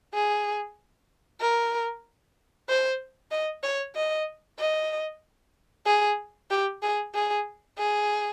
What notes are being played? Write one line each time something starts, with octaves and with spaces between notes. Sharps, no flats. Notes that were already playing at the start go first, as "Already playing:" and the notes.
G#4
A#4
C5
D#5
C#5
D#5
D#5
G#4
G4
G#4
G#4
G#4